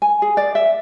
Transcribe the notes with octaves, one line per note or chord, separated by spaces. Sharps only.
G#5
G#4
D5
E5